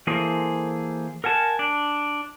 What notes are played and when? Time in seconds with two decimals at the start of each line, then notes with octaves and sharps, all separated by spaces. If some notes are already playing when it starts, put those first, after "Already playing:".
0.07 E3 A#3 G#4 A4 C5
1.24 A#4 F#5 G#5 A5
1.59 D4